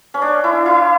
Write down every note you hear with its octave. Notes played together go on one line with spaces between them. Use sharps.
C#4
D4
E4
E4